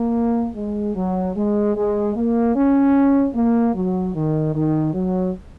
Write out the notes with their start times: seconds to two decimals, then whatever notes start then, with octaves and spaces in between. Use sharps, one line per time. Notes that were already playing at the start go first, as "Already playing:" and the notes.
Already playing: A#3
0.56 G#3
0.96 F#3
1.36 G#3
1.75 G#3
2.15 A#3
2.55 C#4
3.35 A#3
3.75 F#3
4.15 D#3
4.54 D#3
4.94 F#3